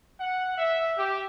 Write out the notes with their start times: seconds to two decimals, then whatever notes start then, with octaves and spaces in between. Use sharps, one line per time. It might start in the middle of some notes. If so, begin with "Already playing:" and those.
0.20 F#5
0.58 E5
0.98 G4